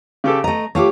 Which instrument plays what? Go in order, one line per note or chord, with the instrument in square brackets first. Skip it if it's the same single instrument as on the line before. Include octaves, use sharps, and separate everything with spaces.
[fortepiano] C#3 G4 A4
[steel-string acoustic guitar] A3 D#5 [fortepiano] A#5
[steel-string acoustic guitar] A3 F4 G4 [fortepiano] C#5 D6